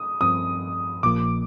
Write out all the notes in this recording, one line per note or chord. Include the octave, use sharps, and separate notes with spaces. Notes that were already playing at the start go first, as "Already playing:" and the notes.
Already playing: D#6
G2 F3 C4 D#6
A#1 A#2 F3 A#3 D6